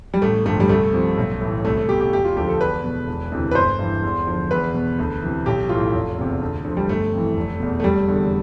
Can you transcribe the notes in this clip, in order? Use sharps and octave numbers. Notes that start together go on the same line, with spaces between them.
G3
A1 A3
G2 D3 F3 A3
G3
C2 A3
C3 F3
B1
A2 E3
C2 A3
A3
B2 G4
G4
E1 G4
F4
D2 D3 F3 G4
A4
E2 B4
B2
E1
D2 C3 E3
B4
G1 C5
G2 E3
E2
D3 F3
E2 B4
B2
D2
C3 E3
B1 G4
A2 E3 F4
F1
E2 C3
D2
D3 F3
G3
G1 A3
F2 E3
F1
E2 B2
A3
F1 G3
E2 D3